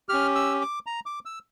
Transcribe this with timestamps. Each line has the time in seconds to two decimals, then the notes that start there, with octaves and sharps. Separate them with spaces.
0.09 C#4 G4 F6
0.35 E6
0.61 D6
0.86 A#5
1.06 D6
1.25 E6